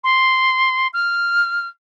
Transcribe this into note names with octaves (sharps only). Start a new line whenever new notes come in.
C6
F6